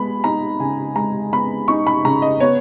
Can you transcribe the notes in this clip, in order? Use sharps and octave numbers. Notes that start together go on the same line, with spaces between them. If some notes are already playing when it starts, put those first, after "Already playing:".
Already playing: G#3 B3 B5
D#4 A#5
C#3 G#5
G#3 A#5
B3 B5
D#4 C#6
B5
C#3 A#5
D#5
B3 C#5